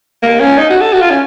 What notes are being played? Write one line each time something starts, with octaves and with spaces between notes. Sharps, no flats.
A#3
C#4
D#4
F#4
A4
F#4
F4
C#4